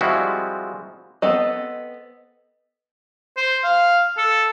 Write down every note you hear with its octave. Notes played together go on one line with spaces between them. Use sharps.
F3 G3 G#3 C4 E4 F#4
B3 C4 A4 D#5
C5
F5
A4